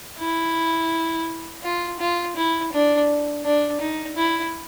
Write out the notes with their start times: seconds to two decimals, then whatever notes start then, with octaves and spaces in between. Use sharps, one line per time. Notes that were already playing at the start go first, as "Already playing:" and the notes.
0.19 E4
1.64 F4
2.00 F4
2.36 E4
2.73 D4
3.45 D4
3.81 D#4
4.17 E4